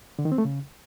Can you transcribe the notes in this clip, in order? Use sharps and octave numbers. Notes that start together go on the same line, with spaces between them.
D3
D#3
C4
A3
C#3